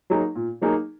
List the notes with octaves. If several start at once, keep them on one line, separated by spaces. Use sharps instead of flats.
F#3 A#3 D#4 G#4
A#2
F#3 A#3 D#4 G#4